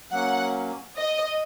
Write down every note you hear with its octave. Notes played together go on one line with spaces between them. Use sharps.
F#3 A#3 C#4 F#5
D#5